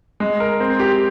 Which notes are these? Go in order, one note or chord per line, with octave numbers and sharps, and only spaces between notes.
G#3
A#4
C4
G4